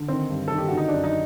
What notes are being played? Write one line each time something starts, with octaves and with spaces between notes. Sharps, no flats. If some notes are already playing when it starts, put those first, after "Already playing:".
Already playing: D3
D#3 C4
G2
D#3 A4
G4
D3 F#4
D#4
F#2 D4
D#4